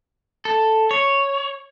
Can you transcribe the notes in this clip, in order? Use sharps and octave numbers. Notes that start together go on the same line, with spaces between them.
A4
C#5